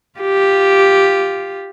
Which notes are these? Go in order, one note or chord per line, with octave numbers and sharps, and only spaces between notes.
F4 G4